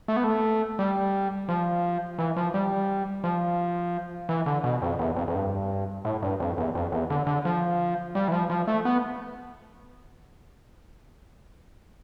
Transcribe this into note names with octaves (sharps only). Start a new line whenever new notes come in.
A3
B3
A3
G3
F3
E3
F3
G3
F3
E3
D3
B2
F2
E2
F2
F2
G2
A2
G2
F2
E2
F2
E2
D3
D3
F3
G3
E3
F3
F3
A3
B3